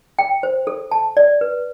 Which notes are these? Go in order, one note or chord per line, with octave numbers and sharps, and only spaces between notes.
G5
C5
A4
A5
D5
B4